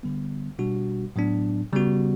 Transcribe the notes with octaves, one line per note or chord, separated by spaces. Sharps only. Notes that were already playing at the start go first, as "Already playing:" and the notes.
D3 G3 B3
B2 G3 D4 F#4
A2 F#3 B3 D4
C#3 G3 B3 F#4